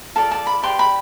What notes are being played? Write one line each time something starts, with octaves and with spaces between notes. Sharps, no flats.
F4 A4 D5 A5
A5
B5
G4 B4 D5 C6
B5